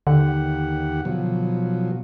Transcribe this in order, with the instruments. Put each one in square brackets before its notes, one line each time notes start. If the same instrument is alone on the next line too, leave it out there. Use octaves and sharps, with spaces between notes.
[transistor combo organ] D#2 G4 F#5 [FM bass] D3
[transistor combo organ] B2 F3 F#3